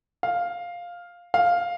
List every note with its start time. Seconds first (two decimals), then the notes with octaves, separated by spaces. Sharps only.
0.23 F5
1.34 F5